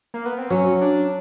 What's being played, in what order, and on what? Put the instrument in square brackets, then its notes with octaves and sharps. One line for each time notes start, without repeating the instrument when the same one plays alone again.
[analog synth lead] A#3
B3
C4
[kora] F#3 [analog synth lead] C#4
[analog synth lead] D4